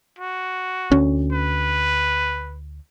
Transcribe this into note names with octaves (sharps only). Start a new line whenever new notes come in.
F#4
D2 C#4
B4